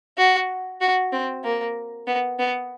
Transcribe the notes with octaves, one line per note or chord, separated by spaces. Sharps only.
F#4
F#4
C4
A#3
B3
B3